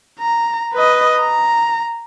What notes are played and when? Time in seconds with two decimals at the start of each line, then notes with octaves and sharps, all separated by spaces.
0.20 A#5
0.73 B4 D#5
1.20 A#5